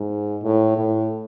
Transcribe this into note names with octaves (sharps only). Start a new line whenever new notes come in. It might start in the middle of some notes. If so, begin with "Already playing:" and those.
Already playing: G#2
A2
A2